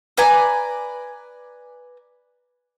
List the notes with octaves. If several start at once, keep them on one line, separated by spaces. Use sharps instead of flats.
B4 D5 G#5 A#5